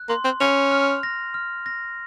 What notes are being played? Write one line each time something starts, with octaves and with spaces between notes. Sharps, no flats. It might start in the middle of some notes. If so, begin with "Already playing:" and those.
Already playing: F#6
A#3 C6
C4
C#4 F7
F6
A#6
F6
A#6